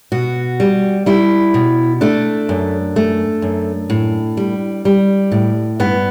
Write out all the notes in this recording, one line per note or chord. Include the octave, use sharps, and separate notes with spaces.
B2 F#4
G3
G3 E4
B2
A3 D4
F#2
A3
F#2
A2
G3
G3
A2
G2 B3